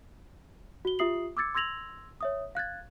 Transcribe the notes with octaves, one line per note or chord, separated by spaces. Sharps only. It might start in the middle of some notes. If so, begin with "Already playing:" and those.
F#4 G7
F4 G4 E5 D#6 C7 F#7
D6 E6 G#6 A6 C#7
C6 E6 G#6 A#6 F7 F#7
C#5 E5 D#6
F5 F#6 G#6 A6